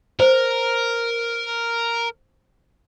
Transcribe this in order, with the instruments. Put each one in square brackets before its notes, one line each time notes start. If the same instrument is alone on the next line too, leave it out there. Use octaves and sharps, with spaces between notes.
[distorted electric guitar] A#4 [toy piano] C5